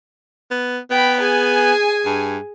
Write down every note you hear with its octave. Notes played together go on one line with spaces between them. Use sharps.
B3
B3 G5 B5
G#4 G#5
G2